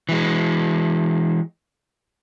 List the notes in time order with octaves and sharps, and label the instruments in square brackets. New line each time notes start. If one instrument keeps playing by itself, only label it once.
[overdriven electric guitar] E3 G#3